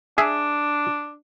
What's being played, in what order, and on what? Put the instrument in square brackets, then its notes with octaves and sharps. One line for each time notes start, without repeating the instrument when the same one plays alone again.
[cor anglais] D4 [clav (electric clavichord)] G#4 E5